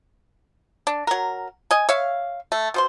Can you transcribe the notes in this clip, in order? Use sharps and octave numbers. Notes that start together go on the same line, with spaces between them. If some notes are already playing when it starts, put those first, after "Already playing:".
D4
F#3 A#4
D#5 G#5
C#5 E5 F5
A3
B2 C5 C6